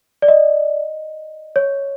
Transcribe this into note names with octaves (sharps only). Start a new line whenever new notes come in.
D5
D#5
C#5